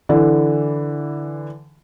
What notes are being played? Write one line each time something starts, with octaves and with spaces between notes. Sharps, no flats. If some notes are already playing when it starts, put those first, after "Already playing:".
D3 E3